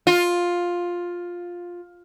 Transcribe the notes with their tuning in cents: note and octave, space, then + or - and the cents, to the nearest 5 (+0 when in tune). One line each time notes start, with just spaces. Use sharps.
F4 +10